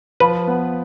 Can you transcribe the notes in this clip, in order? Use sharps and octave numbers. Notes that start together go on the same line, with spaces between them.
F3 B4
B3